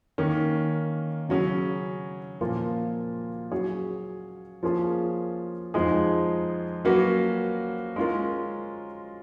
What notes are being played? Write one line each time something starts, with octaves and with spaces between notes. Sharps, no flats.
D#3 A#3 C#4
C#3 F#3 C#4 G#4
A#2 F3 A#3 F4
F#3 C#4 G#4 C#5
F3 A#3 C#4 F4 G#4
F2 F3 G#3 D#4 G#4
F#3 A#3 C#4 F#4 B4
G#3 C#4 F4 A#4